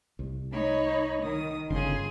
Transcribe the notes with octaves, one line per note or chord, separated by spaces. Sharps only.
C2
D#4 C#5 B5
D#3 D#6
G1 C#3 G#4 C6